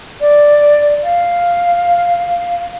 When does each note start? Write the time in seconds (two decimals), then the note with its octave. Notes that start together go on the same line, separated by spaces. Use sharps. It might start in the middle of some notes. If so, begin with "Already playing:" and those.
0.21 D5
1.04 F5